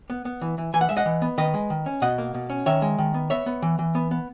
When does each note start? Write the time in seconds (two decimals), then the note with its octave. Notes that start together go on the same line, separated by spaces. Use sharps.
0.10 B3
0.25 B3
0.42 E3
0.58 E3
0.73 E3 G#5
0.81 F#5
0.89 G#3 E5
0.97 D#5 F#5
1.06 E3
1.22 B3
1.38 D#3 B4 D#5
1.54 G#3
1.70 D#3
1.86 C#4
2.02 B2 D#5 F#5
2.18 A#3
2.34 B2
2.50 C#4
2.66 D#3 C#5 E5
2.82 G#3
2.98 D#3
3.14 B3
3.30 B3 C#5 E5
3.46 B3
3.62 E3
3.79 E3
3.95 B3
4.11 B3